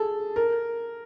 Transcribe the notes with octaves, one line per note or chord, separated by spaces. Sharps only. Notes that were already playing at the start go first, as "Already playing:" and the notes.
Already playing: G#4 A4
A#4